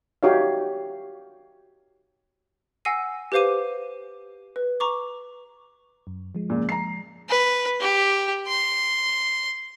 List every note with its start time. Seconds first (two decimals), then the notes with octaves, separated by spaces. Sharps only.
0.23 D#4 F#4 G4 C#5 E5 F5
2.85 F#5 G#5 E6 A#6 C7 D#7
3.32 G4 B4 C5 F5 D6 D#7
4.56 B4
4.80 A#5 C#6 D6
6.07 F#2
6.35 F3 G#3
6.50 A#2 C#3
6.69 A#5 C7
7.29 B4
7.80 G4
8.47 C6